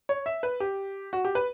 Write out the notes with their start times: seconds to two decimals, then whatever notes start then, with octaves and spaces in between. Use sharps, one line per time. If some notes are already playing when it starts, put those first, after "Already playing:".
0.09 C#5
0.26 E5
0.43 B4
0.60 G4
1.13 F#4
1.25 G4
1.35 B4